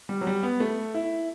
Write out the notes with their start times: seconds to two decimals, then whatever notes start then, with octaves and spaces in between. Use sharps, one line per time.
0.09 G3
0.21 F#3
0.27 G3
0.43 B3
0.60 A3
0.94 E4